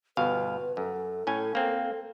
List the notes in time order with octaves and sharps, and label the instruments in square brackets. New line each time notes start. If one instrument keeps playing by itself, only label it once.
[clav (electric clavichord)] G1 B2 F5 [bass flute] B4
[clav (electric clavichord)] F#2 [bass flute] A4
[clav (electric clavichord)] A2 C#4 G#5
A#3 C4